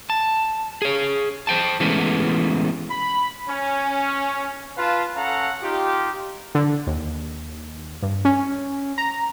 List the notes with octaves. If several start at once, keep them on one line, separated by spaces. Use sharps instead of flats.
A5
G#4 C#5
C5 G5 A5
E3 G#3 A3 B3 C#4
B5
C#4
F4 B4 F5 A5
C#4 A4 F5 F#5 A#5
D#4 F4 G4
D3
D#2
G2
C#4
A#5